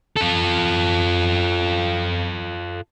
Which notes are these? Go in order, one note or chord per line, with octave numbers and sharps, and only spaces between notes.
F4 A4